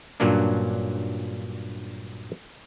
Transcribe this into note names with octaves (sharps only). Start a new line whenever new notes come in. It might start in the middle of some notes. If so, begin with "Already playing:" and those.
G2 A#2 F#3 A#3 C#4 D4